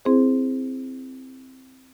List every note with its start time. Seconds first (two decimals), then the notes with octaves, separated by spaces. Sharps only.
0.05 C4 E4 G#4 C5